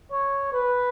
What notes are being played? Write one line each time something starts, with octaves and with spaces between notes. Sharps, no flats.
C#5
B4